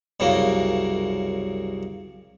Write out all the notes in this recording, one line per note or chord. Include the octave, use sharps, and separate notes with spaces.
C2 F#2 C#3 A#3